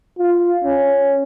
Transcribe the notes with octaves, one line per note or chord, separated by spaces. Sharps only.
F4
C#4